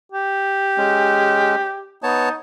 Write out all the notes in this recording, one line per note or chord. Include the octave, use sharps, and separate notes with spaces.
G4
G#3 C#4
B3 D#4 C#5 A5